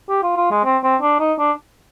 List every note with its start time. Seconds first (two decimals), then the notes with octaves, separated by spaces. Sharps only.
0.09 G4
0.23 F4
0.37 F4
0.51 G#3
0.65 C4
0.83 C4
1.02 D4
1.20 D#4
1.39 D4